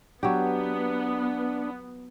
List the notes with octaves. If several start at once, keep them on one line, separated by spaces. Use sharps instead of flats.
F#3 B3 D4 G4